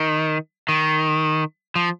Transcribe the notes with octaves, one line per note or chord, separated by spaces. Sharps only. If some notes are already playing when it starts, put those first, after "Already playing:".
Already playing: D#3
D#3
F3